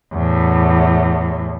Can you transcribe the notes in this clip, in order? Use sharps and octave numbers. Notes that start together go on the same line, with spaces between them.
E2 A2